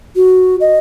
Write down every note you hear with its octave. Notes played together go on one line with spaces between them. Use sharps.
F#4
D#5